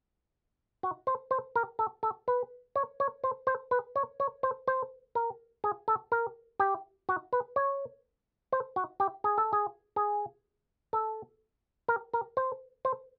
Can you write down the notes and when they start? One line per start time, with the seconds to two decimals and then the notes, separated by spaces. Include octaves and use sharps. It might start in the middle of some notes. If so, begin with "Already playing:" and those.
0.83 F#4
1.07 C5
1.31 C5
1.56 A#4
1.79 A4
2.03 A4
2.28 B4
2.76 C#5
3.00 C#5
3.24 C5
3.47 C5
3.71 B4
3.96 C#5
4.20 C#5
4.43 C5
4.68 C5
5.15 A#4
5.64 G#4
5.88 A4
6.12 A#4
6.60 G4
7.09 F#4
7.33 B4
7.56 C#5
8.52 C5
8.76 F#4
9.00 G4
9.24 G#4
9.38 A4
9.53 G#4
9.96 G#4
10.93 A4
11.88 A#4
12.14 A#4
12.37 C5
12.85 C5